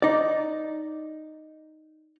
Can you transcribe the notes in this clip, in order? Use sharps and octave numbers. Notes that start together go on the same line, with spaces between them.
D#4 D5